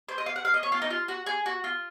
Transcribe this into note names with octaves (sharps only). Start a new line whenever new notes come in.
C5
D#5
F5
F#5
F5
D#5
C#5
F4
D#4
F4
F#4
G#4
F#4
F4